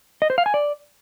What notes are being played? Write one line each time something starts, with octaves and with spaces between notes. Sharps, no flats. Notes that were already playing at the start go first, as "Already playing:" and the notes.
D#5
C5
F5
G#5
D5